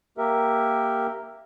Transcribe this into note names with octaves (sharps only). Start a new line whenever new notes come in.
A#3 G4 A#4 E5